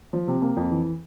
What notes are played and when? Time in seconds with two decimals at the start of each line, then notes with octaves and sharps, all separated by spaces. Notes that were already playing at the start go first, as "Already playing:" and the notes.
0.13 F3
0.28 C3
0.42 A#3
0.57 F2
0.71 E3